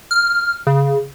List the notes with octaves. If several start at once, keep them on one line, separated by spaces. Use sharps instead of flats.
F6
C#3